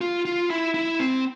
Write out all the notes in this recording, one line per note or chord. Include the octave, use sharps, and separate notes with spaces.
F4
F4
E4
E4
C4